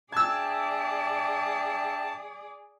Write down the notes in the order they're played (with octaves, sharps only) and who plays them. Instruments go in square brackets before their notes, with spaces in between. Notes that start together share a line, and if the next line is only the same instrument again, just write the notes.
[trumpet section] D4 E5 G5 [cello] G#4 D5 [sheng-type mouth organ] A5 [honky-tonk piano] E6 G#6